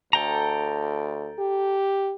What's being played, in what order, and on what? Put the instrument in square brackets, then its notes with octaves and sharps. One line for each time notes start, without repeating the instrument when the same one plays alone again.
[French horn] D2 [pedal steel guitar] A4 G5 A#5
[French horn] G4